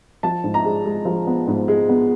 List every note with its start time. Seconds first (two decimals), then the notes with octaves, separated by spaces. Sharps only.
0.23 F3 A5
0.44 G#2
0.54 A#5
0.65 G#3
0.85 G#3
1.05 F3
1.27 B3
1.47 G#2
1.68 G#3
1.89 B3